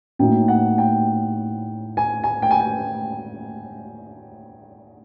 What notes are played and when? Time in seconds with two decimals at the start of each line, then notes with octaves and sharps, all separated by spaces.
0.19 A2 F#3 A#3 D#4 G5
0.48 F#5
0.78 G5
1.97 G#5
2.24 G#5
2.42 G5
2.51 G#5
2.60 G5